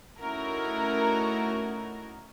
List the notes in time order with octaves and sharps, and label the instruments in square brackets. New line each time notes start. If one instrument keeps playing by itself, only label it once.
[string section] A3 C#4 D#4 E4 F#4 A#4